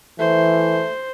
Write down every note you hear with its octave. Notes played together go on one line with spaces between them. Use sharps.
E3 A3 C5